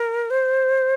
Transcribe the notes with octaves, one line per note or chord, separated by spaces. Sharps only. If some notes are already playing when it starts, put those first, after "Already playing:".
Already playing: A#4
C5